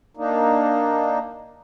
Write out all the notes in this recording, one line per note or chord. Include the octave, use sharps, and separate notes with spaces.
A#3 D4 D#4